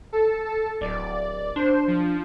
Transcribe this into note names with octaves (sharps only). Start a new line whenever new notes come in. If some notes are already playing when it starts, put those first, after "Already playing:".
A4
A4
D1 D5
D4 C5
F3